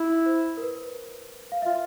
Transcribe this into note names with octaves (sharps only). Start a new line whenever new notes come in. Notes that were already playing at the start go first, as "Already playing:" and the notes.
Already playing: E4
C5
A#4
B4
F5
F4 E5